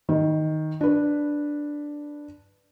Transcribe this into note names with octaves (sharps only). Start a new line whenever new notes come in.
D#3
D4 B4